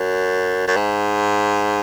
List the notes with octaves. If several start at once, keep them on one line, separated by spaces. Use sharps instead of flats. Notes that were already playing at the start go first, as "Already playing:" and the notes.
Already playing: F#2
F#2
G#2